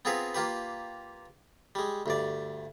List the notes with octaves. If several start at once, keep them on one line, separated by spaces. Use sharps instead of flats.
B3 C4 F4 G#4 A#4 B4
A#3 F4 G4 B4
G3 G#3
D2 G2 D5